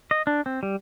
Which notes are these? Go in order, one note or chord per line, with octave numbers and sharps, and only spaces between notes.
D#5
D4
C4
G3